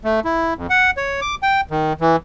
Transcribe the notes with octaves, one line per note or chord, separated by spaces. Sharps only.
A3
E4
F2
F#5
C#5
D6
G5
D#3
E3